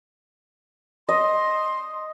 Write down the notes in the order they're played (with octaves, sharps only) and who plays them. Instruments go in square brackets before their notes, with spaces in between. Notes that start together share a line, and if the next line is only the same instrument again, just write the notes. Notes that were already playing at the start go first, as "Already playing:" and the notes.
[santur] D#5 [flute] C6